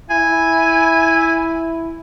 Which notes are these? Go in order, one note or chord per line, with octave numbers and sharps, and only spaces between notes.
E4 G#5